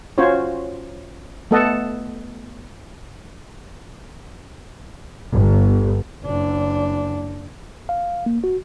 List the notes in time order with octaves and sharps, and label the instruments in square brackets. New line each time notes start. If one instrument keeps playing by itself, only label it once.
[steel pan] C#4 F4 F#4 C5 C#5
A3 B3 A4 D#5 F#5 A5
[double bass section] G1
[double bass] F#1 D4
[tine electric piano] F5
A#3
F#4